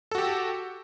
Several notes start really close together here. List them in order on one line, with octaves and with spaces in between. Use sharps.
A4 F#4 G4